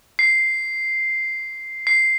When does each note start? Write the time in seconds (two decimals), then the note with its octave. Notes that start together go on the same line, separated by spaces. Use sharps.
0.19 C7
1.87 C7